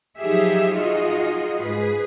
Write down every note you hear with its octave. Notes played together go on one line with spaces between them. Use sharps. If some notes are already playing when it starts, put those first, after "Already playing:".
F3 F#3 D#4 G4 G#4 E5
D#4 F4 F#4 G#4 D#5
G#2 G#4 B4